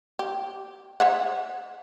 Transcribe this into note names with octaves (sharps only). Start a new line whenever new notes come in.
G4
C5 E5 F#5